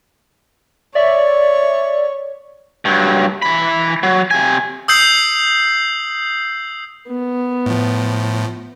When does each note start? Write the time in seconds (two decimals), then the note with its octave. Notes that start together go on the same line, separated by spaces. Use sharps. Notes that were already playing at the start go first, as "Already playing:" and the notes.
0.95 C#5 D5 E5
2.85 G2 F#3
3.42 E3 B5
4.03 F#3
4.31 C3 G#5
4.88 D#6 E6 G6 C7 F#7
7.08 B3
7.66 A2 F3